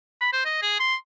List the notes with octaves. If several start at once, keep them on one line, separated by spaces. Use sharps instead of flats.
B5
C5
D#5
G#4
C6